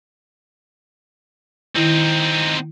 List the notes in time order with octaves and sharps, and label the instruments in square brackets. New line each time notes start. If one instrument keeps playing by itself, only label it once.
[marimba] D#3 E4 [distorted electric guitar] C4 D#4